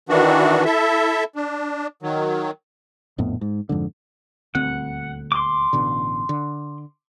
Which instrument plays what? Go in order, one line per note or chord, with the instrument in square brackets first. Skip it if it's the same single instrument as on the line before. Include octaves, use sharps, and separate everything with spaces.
[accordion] D#3 E3 D4 F#4
E4 A4 E5
D4
D#3 F#3
[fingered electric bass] A#1 F2 A2 B3
G#2
F2 G#2 D3
[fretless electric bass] D#1 D2 C4 [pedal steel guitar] F#5
[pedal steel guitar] C6 D6
[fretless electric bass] A1 B2 D3
D3